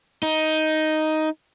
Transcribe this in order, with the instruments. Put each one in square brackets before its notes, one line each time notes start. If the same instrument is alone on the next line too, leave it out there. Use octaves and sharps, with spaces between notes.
[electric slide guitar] D#4